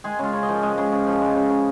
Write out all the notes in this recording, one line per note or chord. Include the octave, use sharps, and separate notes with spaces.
G#3 G#4
C#3 F4
C#3
D#5
F3
G#3 D#5
C#3
C#3
F3
G#3
C#3
C#3